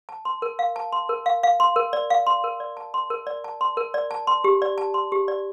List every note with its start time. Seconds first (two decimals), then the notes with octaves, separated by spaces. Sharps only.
0.09 A5
0.25 C6
0.42 A#4
0.59 F5
0.76 A5
0.93 C6
1.09 A#4
1.26 F5
1.43 F5
1.60 C6
1.76 A#4
1.93 D5
2.10 F5
2.27 C6
2.44 A#4
2.60 D5
2.77 A5
2.94 C6
3.10 A#4
3.27 D5
3.44 A5
3.61 C6
3.77 A#4
3.94 D5
4.11 A5
4.27 C6
4.44 G4
4.62 D5
4.78 A5
4.94 C6
5.12 G4
5.28 D5